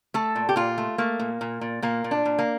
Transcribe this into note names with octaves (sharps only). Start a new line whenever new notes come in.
A3 A4
A#2
G4
A#2 F4
A3
A3 A#3
A#2
A#2
A#2
A#2 A#3
A#2
D4
A#2
A#3